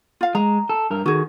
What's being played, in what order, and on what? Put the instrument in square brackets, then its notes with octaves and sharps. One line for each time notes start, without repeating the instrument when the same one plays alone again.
[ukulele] F4 F5
[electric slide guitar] G#3 [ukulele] A#5
[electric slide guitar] A4
G2 A#4
[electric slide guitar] D#3 [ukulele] F#4 G#4